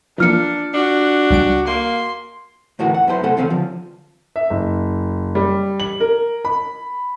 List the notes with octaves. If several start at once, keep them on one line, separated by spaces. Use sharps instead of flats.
E3 F3 A#3 D4 F4 F6 C#7
D4 F#4
C#2 G3 D7
A#3 C6
D2 A2 E3 F#4 A#4 F#5
F#5
F#2 B3 E4 G#4 C5
C3 A3 A4 C5 F#5
E2 C#3 C4 C#4 F5
D3 F3
E5
F#1
G3
F#7
A#4
B5